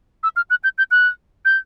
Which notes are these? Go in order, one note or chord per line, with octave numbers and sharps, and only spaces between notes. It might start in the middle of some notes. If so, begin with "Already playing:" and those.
E6
F6
F#6
G6
G6
F#6
G6